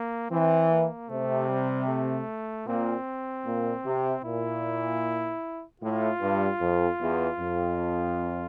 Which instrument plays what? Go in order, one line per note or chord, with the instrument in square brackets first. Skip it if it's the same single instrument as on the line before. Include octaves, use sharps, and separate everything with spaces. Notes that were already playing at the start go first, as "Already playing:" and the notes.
Already playing: [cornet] A#3
[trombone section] E3 [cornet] C4
[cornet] A#3
[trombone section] C3 [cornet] A3
[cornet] G3
A3
[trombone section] A#2 [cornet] C4
[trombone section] A#2
C3
[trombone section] A#2 [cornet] E4
[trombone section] A2 [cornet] F4
[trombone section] G2
F2
E2
F2